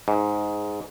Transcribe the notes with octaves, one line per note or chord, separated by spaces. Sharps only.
G#2